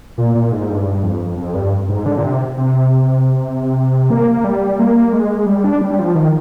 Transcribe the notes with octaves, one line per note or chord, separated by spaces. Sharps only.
A#2
A#2
G#2
G2
F2
F2
G2
G#2
D3
A#2
C3
C3
A#3
G3
A#3
G#3
G3
D4
G3
F3
D#3